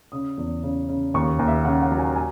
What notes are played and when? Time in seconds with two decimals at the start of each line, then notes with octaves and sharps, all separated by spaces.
0.12 C#3 D#6
0.38 E2
0.63 C#3
0.89 C#3
1.14 D#2 C#6
1.39 D#2
1.48 E5
1.65 C#3 F#5
1.82 F#5
1.91 F#3 A#5
1.99 G#5
2.16 G#5